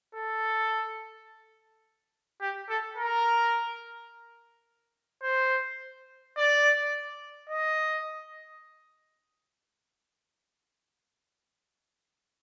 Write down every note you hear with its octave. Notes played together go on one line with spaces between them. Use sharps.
A4
G4
A4
A#4
C5
D5
D#5